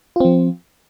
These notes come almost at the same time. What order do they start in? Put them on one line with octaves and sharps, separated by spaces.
F4 C4 F3